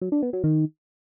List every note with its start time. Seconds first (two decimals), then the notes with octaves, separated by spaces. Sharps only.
0.01 F#3
0.12 D4
0.23 B3
0.33 F#3
0.44 D#3